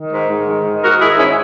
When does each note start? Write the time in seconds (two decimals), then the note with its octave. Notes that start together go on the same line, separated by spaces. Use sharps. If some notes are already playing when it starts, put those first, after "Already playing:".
Already playing: D#3
0.12 G#2
0.29 G#2
0.47 D#3
0.65 D#3
0.82 G#2 F#4 A#4
1.00 G#2 E4 G#4
1.18 D#3 C#4 E4